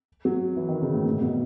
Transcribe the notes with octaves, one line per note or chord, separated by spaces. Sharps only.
F#3
E3
D#3
C#3
A2
A#2
B2